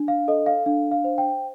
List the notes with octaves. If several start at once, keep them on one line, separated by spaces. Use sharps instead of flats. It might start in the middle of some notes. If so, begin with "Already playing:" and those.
Already playing: D4
F5
A4 D#5
F5
D4 F5
F5
C5
G5